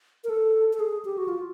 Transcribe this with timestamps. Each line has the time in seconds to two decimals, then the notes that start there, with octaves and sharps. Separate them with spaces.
0.24 A#4
0.29 A4
0.73 A4
0.80 G#4
1.05 G4
1.18 F#4
1.28 F4